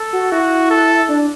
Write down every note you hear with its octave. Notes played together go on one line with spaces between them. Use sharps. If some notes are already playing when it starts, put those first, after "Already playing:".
Already playing: A4
F#4
E4 F#4
A4
D4